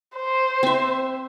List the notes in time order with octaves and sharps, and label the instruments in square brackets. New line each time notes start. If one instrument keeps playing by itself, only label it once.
[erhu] C5
[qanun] C4 E5